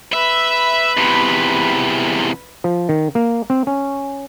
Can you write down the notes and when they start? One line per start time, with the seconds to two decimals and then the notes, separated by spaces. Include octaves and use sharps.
0.14 B4 E5 B5
0.97 E2 C3
2.64 F3
2.89 D#3
3.15 A#3
3.50 C4
3.67 C#4